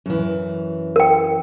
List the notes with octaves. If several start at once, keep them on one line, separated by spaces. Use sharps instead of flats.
F#2 E3
A#4 G5